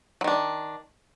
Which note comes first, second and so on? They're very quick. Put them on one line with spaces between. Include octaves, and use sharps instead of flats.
F#3 D#3 D4